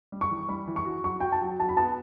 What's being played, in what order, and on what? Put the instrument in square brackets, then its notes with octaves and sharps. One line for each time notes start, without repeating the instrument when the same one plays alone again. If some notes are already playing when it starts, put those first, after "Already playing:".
[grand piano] G3
[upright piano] C#6
[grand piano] E3
[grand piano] G3 [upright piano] B5
[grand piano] E3
[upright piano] C#6
[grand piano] F#4
[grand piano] F#3 [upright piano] C#6
[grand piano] F#4 [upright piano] G5
[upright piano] A5
[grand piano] F#3
[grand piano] F#3 [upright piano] A5
[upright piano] B5
[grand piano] B3 [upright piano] A5